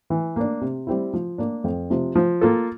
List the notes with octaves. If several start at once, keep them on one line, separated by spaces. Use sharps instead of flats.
E3
A#3 D4
C3
G3 C4 E4
F3
A#3 D4
F2
C3 F3
F3
A#3 F4 A4